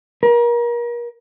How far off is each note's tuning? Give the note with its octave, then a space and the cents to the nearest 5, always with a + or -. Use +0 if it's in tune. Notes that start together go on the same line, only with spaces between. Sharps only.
A#4 +35